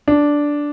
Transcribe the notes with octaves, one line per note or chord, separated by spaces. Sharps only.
D4